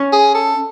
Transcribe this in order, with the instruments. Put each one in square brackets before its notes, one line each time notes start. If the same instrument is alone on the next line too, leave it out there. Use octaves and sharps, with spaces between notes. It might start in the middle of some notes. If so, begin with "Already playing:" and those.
Already playing: [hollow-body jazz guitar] C#4 C#5
[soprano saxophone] G#4
A4